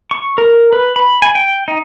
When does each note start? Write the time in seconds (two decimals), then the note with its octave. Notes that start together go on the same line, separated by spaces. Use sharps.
0.11 C#6
0.38 A#4
0.73 B4
0.96 B5
1.22 G#5
1.35 G5
1.68 D#4